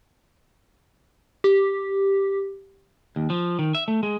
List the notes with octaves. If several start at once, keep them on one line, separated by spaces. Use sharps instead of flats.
G4
D#2
F3
D#3
E5
A3
G#3